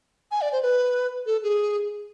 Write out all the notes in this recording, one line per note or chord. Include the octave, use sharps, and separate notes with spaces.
G#5
D5
C5
B4
A4
G#4